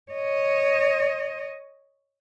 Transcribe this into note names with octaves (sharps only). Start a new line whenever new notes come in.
C#5 D#5